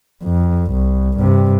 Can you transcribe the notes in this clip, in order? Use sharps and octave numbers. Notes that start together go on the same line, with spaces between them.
F2
C2
G2 C3